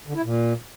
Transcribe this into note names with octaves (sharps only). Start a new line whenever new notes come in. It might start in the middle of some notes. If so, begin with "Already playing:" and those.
D3
E4
A#2